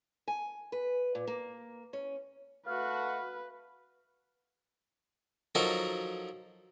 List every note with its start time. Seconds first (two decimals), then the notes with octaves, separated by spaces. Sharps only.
0.28 G#5
0.72 B4
1.15 A#2
1.27 A#3
1.93 C#4
2.67 A3 F#4 B4 F5
5.55 F3 F#3 D#4 F#4 A4 A#4